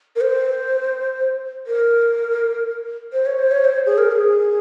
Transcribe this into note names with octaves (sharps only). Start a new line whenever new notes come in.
A#4
C5
A#4
C5
C#5
C5
C#5
C5
G#4
A#4
G#4